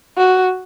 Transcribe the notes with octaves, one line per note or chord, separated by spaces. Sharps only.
F#4